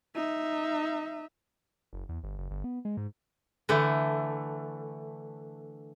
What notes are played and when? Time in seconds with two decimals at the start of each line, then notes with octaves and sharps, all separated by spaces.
0.15 D#4 E5
1.93 F#1
2.09 E2
2.23 G1
2.38 F#1
2.51 G1
2.64 B3
2.85 G#3
2.97 G#2
3.69 D3 E3 A3